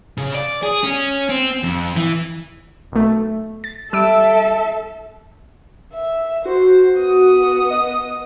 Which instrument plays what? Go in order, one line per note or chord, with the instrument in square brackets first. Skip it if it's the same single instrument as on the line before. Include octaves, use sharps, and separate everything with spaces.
[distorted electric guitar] C#3
D5
G#4
C#4
C4
F2
E3
[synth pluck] B1 A3
A6
[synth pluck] G3 E6 D7 [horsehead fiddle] A4 E5
[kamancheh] E5
[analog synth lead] F#4 [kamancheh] C5
[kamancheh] B3 D#6
[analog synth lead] D#5